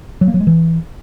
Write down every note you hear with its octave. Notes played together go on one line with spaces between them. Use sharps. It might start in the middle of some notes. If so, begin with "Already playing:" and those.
F#3
A#3
F#3
G#3
E3